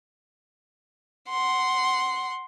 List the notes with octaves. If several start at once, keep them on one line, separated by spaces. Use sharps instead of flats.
F#5 C6